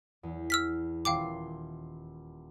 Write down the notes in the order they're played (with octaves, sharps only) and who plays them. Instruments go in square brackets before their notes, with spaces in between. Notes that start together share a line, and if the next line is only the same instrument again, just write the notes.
[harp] E2
[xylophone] E6 F6 B6
[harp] D#1 C6 [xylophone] F5 G5 D6